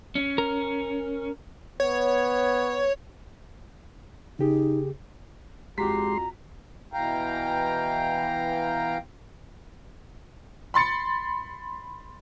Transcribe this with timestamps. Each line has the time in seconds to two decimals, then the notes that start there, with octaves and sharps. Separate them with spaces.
0.15 C#4
0.38 A#4
1.80 B3 C#5
4.39 C#3 D#4 G4 G#4
5.78 F2 G#3 F#4 G4 A#5 C6 B6
6.93 B2 E3 F5 G5 A#5
10.74 B5 C6 A6 C#7